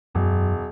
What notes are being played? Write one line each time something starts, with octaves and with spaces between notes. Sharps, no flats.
E1 F#2